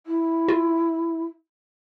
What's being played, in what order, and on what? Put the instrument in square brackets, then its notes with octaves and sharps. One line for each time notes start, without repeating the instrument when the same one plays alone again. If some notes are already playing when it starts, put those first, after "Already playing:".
[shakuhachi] E4
[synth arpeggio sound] F4